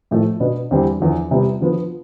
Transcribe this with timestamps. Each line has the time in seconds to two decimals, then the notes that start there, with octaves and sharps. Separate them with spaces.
0.11 A2 F3 A3
0.40 B2 B3 D4
0.71 E2 D3 G3 C4
1.00 E2 D3 F3
1.31 C3 G3 B3 F4
1.60 D3 F3 B3 F4